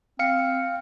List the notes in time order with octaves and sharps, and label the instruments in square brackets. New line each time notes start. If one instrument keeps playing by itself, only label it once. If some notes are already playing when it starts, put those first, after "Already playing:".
[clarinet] C4 [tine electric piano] F5 F6 C#7